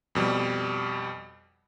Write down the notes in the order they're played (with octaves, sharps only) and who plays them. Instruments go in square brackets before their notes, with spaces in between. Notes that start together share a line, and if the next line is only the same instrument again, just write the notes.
[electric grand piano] F2 B2 G3